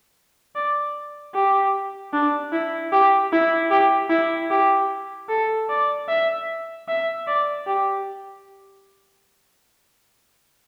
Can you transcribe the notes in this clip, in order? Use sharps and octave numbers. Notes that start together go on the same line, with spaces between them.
D5
G4
D4
E4
G4
E4
G4
E4
G4
A4
D5
E5
E5
D5
G4